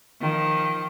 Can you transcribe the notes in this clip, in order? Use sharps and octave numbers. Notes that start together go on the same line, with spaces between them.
D#3 F3